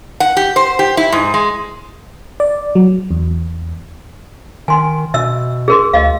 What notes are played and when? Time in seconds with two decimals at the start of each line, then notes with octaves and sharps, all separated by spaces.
0.20 F#5
0.37 G4
0.56 C5
0.79 G4
0.97 E4
1.12 G#2
1.34 G#3
2.40 D5
2.75 F#3
3.11 E2
4.68 D#3 G#5 C6
5.14 B2 E5 E6
5.68 G#4 A#4 C6
5.94 D2 D#5 F5